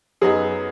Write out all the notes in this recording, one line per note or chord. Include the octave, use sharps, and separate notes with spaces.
F#2 F#3 B3 D#4 G#4